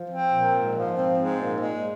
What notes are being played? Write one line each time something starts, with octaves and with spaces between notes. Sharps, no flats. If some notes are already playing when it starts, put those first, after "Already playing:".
Already playing: F3
C4
A#2
G#2
F3
C4
G#2
A#2
G#3